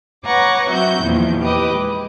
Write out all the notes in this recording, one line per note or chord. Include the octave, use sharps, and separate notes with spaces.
B4 C#5 F#5 A#5 C#6 D6
F#3 C4 F#4 E5 G6
E2 A#2 D#3 F3
G4 B4 D#5 D6
G#3